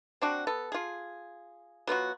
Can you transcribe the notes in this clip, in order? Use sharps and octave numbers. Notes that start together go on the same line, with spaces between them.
C4 D4 F#4
B3 A4
F4 G#4
F#3 B3 F4 F#4